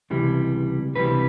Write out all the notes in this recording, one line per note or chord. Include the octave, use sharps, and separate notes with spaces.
C#2 C3 E3 G3
C#2 C3 E3 G3 B4